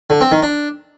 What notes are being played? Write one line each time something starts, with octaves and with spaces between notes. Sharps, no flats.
D3
C4
D#3
D4